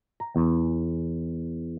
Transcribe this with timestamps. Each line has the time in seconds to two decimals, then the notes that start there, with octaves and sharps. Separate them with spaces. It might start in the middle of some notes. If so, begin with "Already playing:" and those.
0.20 A#5
0.36 E2